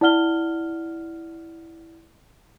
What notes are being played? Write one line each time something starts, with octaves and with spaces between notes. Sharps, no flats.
E4 D5 F#5 F6 G7